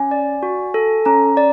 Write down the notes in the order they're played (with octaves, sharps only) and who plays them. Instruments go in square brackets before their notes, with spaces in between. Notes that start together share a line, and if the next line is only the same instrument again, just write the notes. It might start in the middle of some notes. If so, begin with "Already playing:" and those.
Already playing: [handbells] C#4 [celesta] G#5
[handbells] D5
F#4
A4
[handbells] C#4 [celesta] A#5
[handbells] D5